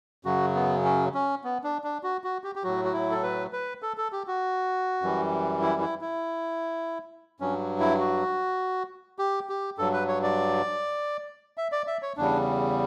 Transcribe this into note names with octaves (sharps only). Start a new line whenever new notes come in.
F#2 C#3 F#3 F#4
B3
C#4
C#4
B3
D4
D4
F#4
F#4
G4
G4
A2 F#3 F#4
F#4
E4
A4
B4
B4
A4
A4
G4
F#4
F#2 E3 G3
E4
E4
E4
G2 F#3 C#4
E4
F#4
G4
G4
G2 F#3 A4
B4
C#5
D5
E5
D5
E5
C#5
E2 C#3 G3 D4